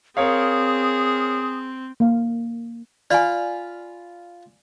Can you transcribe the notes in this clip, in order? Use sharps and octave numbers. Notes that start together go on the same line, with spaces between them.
C4 G#4 A#4 C#5 F5 D#6
A#3 F5
F4 D5 F5 G#5 B5